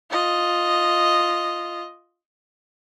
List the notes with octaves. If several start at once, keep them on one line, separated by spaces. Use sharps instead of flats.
F4 D#5